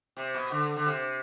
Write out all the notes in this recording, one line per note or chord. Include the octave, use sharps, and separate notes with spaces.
C3
B2
D3
D3
C3